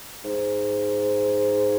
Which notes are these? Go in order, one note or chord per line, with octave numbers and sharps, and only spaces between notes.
G#2